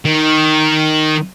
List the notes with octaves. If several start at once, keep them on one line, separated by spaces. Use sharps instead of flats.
D#3